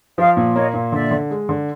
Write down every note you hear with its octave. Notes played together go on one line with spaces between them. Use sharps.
F3 D#5 F5
A#2
A#3 C#5 D#5
A#2
D3 D5 E5
D3
G#3
D3